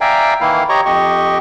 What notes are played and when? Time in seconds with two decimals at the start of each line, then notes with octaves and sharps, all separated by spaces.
0.01 D5 E5 F5 G5 G#5 A#5
0.41 D#3 E3 A#3 E4 F5
0.69 G4 C#5 D#5 A#5 C#6
0.86 F2 G4 D#5 C#6